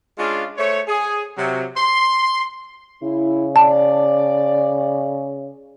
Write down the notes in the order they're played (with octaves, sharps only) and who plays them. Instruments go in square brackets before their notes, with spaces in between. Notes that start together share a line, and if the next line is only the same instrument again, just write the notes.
[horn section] G#3 C#4 D4 F4
A3 C5 C#5
G#4
C3 F#3
C6
[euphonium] C#3 [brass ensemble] E4
[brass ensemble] D5 [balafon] A5